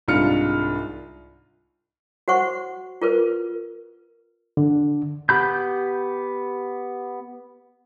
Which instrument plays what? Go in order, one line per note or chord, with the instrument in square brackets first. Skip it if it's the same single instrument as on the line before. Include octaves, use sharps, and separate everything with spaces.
[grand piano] C2 G#2 D4 F4 F6 C#7
[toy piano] F#4 C5 F#5 C#6
F4 A#4 B4
[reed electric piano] D3
[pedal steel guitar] B3 G4 B5 G6